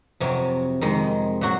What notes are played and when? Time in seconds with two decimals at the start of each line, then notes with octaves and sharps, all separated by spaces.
0.20 F2 C3 F#3
0.81 F2 D#3 G#3
1.41 A#2 F#3 F#4